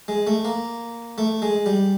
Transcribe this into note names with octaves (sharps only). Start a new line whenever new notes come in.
G#3
A3
A#3
A3
G#3
G3